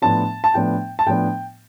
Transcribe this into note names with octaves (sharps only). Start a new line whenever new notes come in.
A2 F3 B3 D4 A5
A5
A2 F3 B3 D4 G5
A5
A2 F3 B3 D4 G5